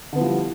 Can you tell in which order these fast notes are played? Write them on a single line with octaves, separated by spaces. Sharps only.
D3 B3 E4 F3 G3